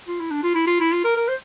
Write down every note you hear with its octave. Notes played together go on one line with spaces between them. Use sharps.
F4
E4
D4
F4
E4
F4
E4
F4
A#4
A#4
C5